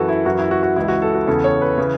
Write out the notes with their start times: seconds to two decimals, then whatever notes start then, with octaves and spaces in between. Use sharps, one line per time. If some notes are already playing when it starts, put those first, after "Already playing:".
Already playing: F#2 E3 F#4 A4
0.08 E4
0.25 F#2 E3 F#4
0.39 E4
0.51 F#4
0.63 F#4
0.76 C#2 C#3 E3 E4
0.88 F#4
1.02 A4
1.14 F#4
1.27 E2 C#3 E3 A4
1.44 C#5
1.62 B4
1.78 C#3 E3